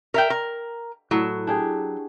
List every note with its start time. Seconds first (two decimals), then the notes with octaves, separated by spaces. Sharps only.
0.14 A#4 E5 G5
0.30 A#4
1.11 A2 F#3
1.47 D4 G4 G#4